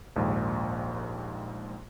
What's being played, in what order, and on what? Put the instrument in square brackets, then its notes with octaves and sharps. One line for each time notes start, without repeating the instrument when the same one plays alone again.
[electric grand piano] A#1 D#2 G#2